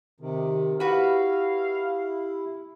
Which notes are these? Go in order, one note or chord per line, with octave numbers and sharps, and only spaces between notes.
C3 D#3
E4 F#4 G4 B4 F5